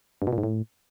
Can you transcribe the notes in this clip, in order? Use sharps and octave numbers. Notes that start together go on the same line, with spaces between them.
G2
B2
A#2
G#2
A2